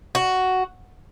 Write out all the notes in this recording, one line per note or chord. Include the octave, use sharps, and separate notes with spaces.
F#4